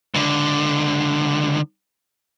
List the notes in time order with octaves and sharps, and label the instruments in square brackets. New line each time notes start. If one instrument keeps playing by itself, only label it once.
[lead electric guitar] C#2 D3